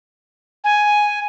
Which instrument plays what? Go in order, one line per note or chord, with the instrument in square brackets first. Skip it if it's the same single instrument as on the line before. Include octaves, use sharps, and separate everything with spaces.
[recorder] G#5